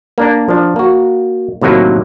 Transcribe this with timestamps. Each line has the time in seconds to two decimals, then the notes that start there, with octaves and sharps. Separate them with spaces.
0.18 A#3 D4 A#4
0.49 F3 D4
0.76 A#3 F#4
1.61 A2 C3 D#3 F#3 A#3